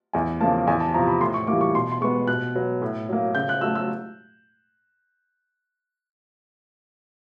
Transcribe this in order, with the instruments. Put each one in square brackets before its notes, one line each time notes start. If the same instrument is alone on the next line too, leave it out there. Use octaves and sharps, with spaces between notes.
[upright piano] E2 G#5
C#3 F3 A#3 A5
E2 G#5
A5
C3 F3 A#5
B5
A2 C6
C#6
E3 G3 A#3 D6
C#6
B2 C6
C6
G#3 B3 C#6
B2 F#6
F#3 B3
A2
F#3 A#3
C#3 G6
F#6
F#3 A3 E6
E6